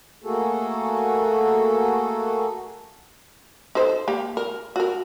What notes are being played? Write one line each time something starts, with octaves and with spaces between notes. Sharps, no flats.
A3 A#3 F#4 G#4 A4
D#4 A4 C5
A#3 G4
A#4
F#4 A#4